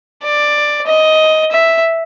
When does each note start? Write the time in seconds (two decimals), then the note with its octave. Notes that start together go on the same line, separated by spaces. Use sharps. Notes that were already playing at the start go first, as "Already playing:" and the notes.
0.23 D5
0.87 D#5
1.51 E5